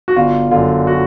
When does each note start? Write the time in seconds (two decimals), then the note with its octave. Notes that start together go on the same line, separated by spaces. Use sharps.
0.08 F#4
0.16 G1 F4
0.51 F#2 D3 F4
0.87 F#4